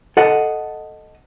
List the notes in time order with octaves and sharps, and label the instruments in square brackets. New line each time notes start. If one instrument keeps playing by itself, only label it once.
[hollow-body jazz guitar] A4 D#5 F#5